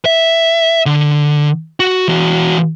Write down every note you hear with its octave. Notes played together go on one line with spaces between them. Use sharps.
E5
D3
F#4
E3 F#4